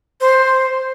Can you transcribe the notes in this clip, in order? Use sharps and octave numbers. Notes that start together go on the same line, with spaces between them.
C5